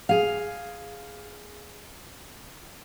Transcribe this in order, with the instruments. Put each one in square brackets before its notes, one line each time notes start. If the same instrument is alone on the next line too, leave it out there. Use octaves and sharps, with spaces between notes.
[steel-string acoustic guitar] G#4 F5